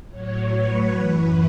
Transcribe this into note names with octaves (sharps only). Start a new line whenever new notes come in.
A2 F#3 C#5
B4
F#2 E3